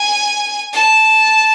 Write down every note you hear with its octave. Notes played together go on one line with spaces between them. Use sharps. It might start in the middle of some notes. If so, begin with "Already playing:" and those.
Already playing: G#5
A5